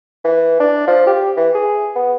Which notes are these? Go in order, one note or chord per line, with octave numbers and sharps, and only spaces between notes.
E3
D4
F3
G4
E3
G#4
B3